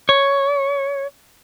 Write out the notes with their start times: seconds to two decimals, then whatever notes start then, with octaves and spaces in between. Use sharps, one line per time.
0.09 C#5